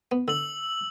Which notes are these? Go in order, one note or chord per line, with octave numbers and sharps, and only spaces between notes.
B3
D3 E6 F#7